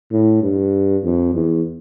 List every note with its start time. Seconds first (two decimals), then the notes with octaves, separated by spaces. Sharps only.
0.11 A2
0.42 G2
1.04 F2
1.34 E2